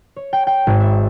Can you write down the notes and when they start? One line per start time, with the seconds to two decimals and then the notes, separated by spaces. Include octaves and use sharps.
0.16 C#5
0.33 G5
0.47 G5
0.67 G#1
0.80 E5